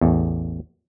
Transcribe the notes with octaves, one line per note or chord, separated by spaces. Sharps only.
A1 E2